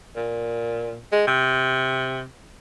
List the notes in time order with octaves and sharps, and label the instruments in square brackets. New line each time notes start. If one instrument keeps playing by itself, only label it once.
[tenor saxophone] A#2
G#3
C3